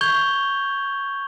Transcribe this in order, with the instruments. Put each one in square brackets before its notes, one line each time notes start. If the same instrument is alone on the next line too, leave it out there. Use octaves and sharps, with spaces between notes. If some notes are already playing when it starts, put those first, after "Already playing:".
[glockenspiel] C#6 G6 G#6 F7 G7